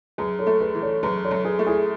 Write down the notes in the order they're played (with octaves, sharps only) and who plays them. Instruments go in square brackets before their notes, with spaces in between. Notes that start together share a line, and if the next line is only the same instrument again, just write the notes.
[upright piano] F#2 [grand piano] G#4 B4
[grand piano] A4 C#5
[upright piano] A3
[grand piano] G#4 B4
[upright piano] E3
[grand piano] A4 C#5
[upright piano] F#2 [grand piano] G#4 B4
[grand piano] A4 C#5
[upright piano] F#2
[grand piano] G#4 B4
[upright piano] A3
[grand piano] E4 G#4